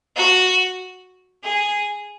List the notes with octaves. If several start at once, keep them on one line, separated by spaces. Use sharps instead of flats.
F#4
G#4